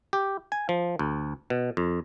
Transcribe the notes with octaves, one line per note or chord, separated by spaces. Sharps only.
G4
G#5
F3
D2
B2
F2